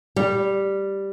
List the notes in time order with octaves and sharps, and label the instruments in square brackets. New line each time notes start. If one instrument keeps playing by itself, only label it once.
[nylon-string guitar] G3